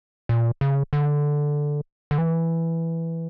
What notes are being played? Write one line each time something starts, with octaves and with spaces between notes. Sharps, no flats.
A#2
C#3
D3
D3
E3